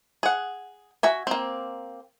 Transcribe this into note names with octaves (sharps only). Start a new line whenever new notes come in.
G#4 F#5
F#4 E5 G#5
A#3 C4